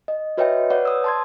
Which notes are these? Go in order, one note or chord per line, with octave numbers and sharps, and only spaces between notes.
D#5
F#4 B4 C#5 D#5 E5 G5
B4 C#5 D5 F#5
D#6 E6
A5 C6 G#6